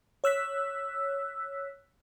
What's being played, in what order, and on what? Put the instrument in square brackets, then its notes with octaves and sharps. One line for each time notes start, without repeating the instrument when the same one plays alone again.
[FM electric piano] C#5 E6 F#6 B6